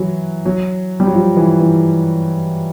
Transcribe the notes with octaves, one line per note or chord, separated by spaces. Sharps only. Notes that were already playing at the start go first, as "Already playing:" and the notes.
Already playing: E3 F#3
F#3
G3
F#3
F3
E3
E3